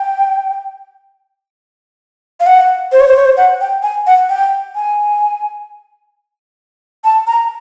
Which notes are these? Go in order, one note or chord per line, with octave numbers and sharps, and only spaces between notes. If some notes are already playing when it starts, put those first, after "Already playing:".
Already playing: G5
F5
F#5
C5
C#5
C5
C#5
C5
F#5
G5
G#5
F#5
G5
G#5
A5
A#5